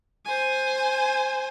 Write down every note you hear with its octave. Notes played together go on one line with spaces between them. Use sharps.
C5 G#5